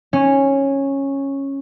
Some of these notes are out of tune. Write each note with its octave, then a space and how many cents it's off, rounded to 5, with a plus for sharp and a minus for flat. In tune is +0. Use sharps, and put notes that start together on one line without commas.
C#4 -10